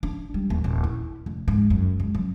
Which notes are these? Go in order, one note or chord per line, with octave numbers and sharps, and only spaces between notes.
D4
G3
D#2
D#1
E4
F1
G#2
F#2
C#2
F#2